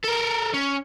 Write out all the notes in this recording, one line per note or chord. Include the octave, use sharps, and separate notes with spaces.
A4 A#4
C#4